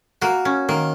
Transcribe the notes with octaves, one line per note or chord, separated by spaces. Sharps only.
A#3 F#4
C#4
D#3 A#3